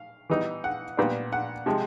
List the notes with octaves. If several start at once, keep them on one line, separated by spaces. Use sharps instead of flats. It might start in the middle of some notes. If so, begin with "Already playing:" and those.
Already playing: F5
E3 G3 B3 D#4
F#5
A#2 G3 B3 D4
F#5
C3 F3 G#3